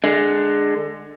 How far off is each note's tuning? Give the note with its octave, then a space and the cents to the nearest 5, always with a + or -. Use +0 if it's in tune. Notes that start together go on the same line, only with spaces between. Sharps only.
D3 +20 G#3 +0